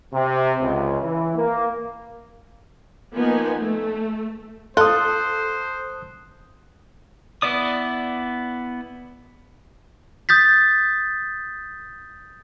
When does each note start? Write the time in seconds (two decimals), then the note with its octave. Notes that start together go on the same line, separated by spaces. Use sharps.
0.14 C3
0.61 C#2
1.02 E3
1.36 A#3
3.13 F3 A#3 B3 D#4 G#5
3.58 A3
4.77 F4 A4 C5 D#6 F#6
7.42 B3 E4 D5 D#6
10.29 D#6 G6 A6 B6